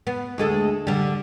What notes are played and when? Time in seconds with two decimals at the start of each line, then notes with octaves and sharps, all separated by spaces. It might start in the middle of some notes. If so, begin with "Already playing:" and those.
0.07 B3
0.38 D2 G#3 A4
0.87 D3 G3